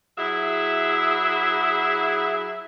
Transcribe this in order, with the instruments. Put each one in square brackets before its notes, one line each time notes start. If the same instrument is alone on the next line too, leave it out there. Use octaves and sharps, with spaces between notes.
[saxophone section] F#3 E4 G#4 E5